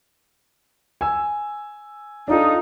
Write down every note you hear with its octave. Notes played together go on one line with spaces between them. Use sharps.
G#5 E6
D4 D#4 F4 A4